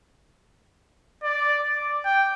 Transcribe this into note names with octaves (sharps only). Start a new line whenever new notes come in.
D5
D6
G5